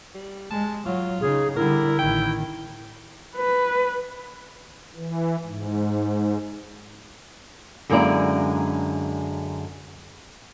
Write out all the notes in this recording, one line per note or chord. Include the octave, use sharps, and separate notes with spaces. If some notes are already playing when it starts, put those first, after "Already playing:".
G3
G#3 A5
F#3 F4
C#3 D#4 G#4
D3 G3 E4 A#4
A1 D#3 G5
B4
E3
G#2
F#2 D3 G#3 A#3 E4 D5